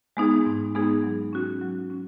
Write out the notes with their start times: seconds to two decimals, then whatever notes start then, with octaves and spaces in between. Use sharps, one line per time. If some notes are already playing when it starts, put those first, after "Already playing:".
0.17 G#3 B3 D#4 G#4
0.46 G#2
0.75 G#3 B3 D#4 G#4
1.04 F#3
1.33 C#4 F#4
1.61 F#3
1.90 C#4